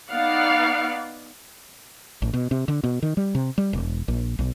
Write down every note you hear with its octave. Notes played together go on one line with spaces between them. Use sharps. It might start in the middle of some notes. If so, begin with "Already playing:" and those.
B3 D#4 D5 F5 F#5
A1
B2
C3
D3
B2
D#3
G3
C3
G3
E1
A#1
B1